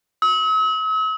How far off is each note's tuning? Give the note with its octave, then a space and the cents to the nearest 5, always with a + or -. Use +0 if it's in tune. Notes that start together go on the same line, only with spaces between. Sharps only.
E6 -45